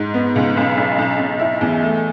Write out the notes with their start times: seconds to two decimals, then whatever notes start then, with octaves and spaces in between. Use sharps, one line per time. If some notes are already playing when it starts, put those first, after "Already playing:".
Already playing: G#2
0.14 B3
0.35 C#2
0.57 B1
0.77 B1
0.98 B1
1.19 B1
1.39 E4
1.61 E2
1.82 A3